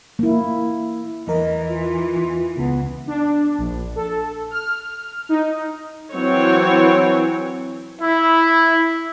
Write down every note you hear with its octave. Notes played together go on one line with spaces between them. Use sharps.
A#3 E4
E2 E3 A#4 D#5
F4
E2
C#2 C#3 B3
D4
A#1
A4
F6
D#4
E3 F#3 C4 C#5
E4